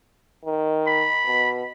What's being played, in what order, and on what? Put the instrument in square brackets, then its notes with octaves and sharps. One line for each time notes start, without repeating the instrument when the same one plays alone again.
[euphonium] D#3
[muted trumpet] B5
[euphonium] B2